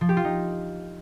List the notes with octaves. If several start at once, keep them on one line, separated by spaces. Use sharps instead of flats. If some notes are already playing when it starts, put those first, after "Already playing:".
F3
G4
F4
D#4